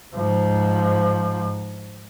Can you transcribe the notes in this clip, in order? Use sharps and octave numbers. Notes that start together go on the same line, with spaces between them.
G#2 F3